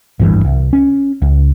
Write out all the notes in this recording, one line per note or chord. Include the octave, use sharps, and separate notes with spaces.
D1 G#1 G2 E3
C2
C#4
C#2